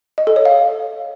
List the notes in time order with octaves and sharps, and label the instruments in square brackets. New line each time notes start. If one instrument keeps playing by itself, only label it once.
[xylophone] D#5
A4
C#5
F5